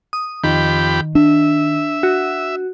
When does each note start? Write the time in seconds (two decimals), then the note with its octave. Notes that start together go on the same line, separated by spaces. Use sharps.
0.13 D#6
0.44 F2 D#3 G4 B5
1.15 D4 E5
2.03 F#4